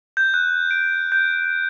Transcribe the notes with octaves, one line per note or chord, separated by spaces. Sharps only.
G6
F#6
D7
G6